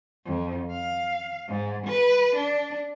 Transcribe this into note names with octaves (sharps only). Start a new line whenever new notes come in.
F2
F5
G#2
B4
D4